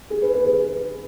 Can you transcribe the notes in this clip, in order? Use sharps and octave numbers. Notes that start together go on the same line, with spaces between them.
G#4
B4
B4
G#4